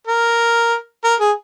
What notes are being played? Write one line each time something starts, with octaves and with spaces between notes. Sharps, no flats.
A#4
A#4
G#4